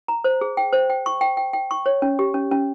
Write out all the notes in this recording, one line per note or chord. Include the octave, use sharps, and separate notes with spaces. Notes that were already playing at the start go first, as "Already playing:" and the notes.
A#5
C5
G#4
G5
C5
G5
C#6
G5
G5
G5
C#6
C#5
C#4
G4
C#4
C#4